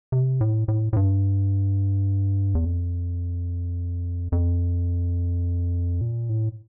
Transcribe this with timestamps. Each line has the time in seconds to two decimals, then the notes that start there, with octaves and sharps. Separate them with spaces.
0.12 C3
0.41 A2
0.68 A2
0.93 A2
0.96 G2
2.55 E2
2.65 F2
4.32 F2
6.01 A#2
6.29 A2